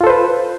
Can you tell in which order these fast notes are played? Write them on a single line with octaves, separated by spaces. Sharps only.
F4 A4 C5 B4